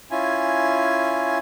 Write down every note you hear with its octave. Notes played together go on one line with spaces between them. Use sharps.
C#4 E4 F4 G#5